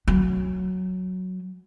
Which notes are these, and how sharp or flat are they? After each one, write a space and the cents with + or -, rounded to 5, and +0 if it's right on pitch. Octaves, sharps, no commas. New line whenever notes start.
F#3 +0 C#4 -15